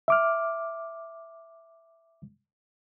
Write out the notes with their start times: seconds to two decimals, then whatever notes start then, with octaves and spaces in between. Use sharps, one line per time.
0.08 E5 D6 F6